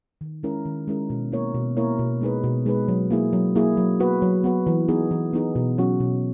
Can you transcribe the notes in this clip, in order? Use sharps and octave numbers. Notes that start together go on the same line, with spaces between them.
D#3
G#3 C#4 E4 A#4
D#3
G#3 C#4 E4 A#4
B2
A#3 E4 A#4 C#5
B2
A#3 E4 A#4 C#5
B2
G#3 D#4 G#4 B4
B2
G#3 D#4 G#4 B4
F#3
A#3 E4 G#4
F#3
A#3 E4 G#4
F#3
B3 F#4 B4
F#3
B3 F#4 B4
E3
B3 D#4 G#4
E3
B3 D#4 G#4
B2
F#3 C#4 F#4
B2